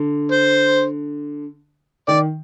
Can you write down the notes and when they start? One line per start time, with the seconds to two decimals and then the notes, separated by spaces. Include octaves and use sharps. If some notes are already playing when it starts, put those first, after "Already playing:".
Already playing: D3
0.32 C5
2.08 D#3 D5